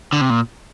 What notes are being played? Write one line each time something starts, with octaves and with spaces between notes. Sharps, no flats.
D3
C3
A#2